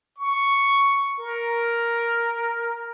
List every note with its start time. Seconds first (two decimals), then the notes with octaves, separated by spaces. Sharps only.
0.18 C#6
1.20 A#4